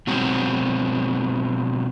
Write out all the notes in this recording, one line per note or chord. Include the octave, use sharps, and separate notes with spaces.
B2 F#3 G#3 C4 F#4